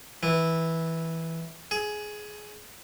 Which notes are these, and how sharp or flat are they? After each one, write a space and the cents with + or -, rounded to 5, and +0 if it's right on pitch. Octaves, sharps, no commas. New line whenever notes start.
E3 -10
G#4 +15